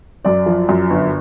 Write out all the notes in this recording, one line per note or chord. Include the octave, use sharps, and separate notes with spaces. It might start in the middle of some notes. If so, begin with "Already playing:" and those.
F#2 D5
F3
F#2
G1